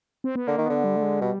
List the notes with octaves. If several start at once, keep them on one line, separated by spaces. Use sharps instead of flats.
C4
B3
D3 A#3
D#3
D3 B3
G3
A3
G#3
B2 G3